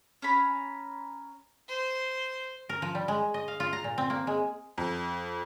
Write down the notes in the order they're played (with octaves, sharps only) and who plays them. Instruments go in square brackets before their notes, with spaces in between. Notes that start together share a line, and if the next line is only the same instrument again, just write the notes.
[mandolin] C#4 A#5 B5
[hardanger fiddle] C5
[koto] A#4
F3
G3
G#3
D#5
F5
F4
A#5
A#2
C4
A#3
G#3
[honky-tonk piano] F2